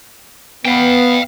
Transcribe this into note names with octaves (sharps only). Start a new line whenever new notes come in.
B3 F5 G5